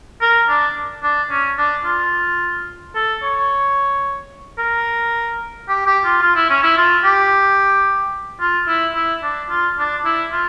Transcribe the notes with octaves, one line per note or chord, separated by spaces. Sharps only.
A#4
D4
D4
C#4
D4
F4
A4
C#5
A#4
G4
G4
F4
F4
E4
C#4
E4
F4
G4
F4
E4
E4
D4
F4
D4
E4
F4